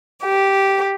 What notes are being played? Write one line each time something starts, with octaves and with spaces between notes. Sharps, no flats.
G4